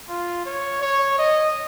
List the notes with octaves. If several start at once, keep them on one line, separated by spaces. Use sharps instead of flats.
F4
C#5
C#5
D#5